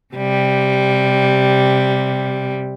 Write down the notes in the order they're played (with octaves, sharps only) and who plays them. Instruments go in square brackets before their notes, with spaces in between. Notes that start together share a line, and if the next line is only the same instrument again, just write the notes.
[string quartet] C3 G3